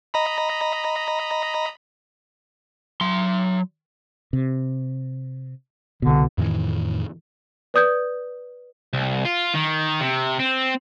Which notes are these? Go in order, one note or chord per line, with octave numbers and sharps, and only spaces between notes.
D#5 A#5 B5
F#3 C6
C3
C2 B2 D3
F2 A2 D#3 E3
B4 D5 D#6 G6 G#6
C2
F4
D#3
C3
C4